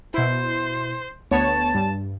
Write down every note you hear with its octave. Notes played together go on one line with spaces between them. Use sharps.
B2 E4 C5
D2 B3 C#5 A5
G2